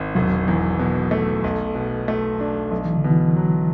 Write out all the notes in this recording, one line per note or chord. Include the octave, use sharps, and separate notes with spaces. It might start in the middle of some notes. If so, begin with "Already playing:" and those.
Already playing: G#1
E1 F#3
E2
B2
A3
B1
B2
A3
D4
B1 F#3
E3
D3
B2
E3
F#3